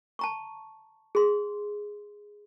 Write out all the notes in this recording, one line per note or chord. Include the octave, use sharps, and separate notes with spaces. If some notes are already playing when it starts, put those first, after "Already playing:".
A5 A#5 C#6
G#4 C6